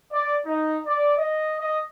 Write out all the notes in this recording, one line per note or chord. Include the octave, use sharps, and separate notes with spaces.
D5
D#4
D5
D#5
D#5